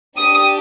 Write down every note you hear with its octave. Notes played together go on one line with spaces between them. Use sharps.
D4 G4 D#6